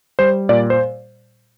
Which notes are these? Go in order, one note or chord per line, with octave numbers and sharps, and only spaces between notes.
G3 C5
A#2 D5
C5